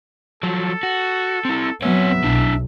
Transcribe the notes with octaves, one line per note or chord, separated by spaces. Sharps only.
F3 F#3 A4
F#4
C4 E4
F#3 B3 C4 C#5 E5
B1 D4 E4